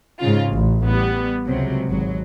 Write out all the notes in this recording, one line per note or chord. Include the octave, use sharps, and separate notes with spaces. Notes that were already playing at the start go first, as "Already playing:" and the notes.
G#2 C#3 F4
A1
G3 B3
C#2 C3 F#3
G#1 F#3